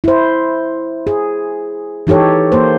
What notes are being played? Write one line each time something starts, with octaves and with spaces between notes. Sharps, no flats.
E4 C5
G#4
E3 D#4 G4 A4 C#5
A#3 C5